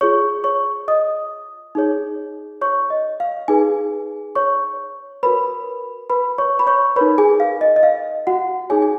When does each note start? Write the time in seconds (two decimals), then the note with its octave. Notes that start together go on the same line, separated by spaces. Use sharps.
0.01 F4 G#4 C#5 C#6
0.44 C#5 C#6
0.88 D#5 D#6
1.75 D#4 G#4 C#5
2.61 C#5 C#6
2.90 D#5
3.20 F5
3.48 D#4 G#4 B4 G#5
4.35 C#5 C#6
5.23 F#4 A#4 B4 C#5 B5
6.10 B4 B5
6.38 C#5 C#6
6.59 B5
6.67 C#5 C#6
6.96 D#4 A#4 B4 C#5 B5
7.18 G#4 G#5
7.40 F5
7.61 D#5
7.76 D#5
7.83 F5
8.27 F#4 F#5
8.70 D#4 G#4 C#5 G#5
8.82 G#5